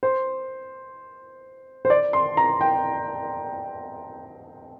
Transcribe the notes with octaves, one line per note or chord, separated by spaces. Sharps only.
C5
C5
D5
C6
A#5
G5